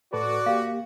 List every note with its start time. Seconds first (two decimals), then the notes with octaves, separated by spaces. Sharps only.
0.13 A2 F#4 A4 B4 D5
0.46 A#3 G4 F5